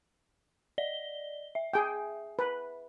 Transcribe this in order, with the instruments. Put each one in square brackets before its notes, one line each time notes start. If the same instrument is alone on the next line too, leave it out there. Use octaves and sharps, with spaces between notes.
[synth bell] D5 D#5 G7
E5
[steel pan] G#4 G5
B4